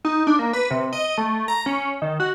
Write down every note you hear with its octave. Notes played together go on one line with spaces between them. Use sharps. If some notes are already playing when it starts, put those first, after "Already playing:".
D#4
D4
A#3
B4
C3
D#5
A3
A#5
C#4
D#3
F#4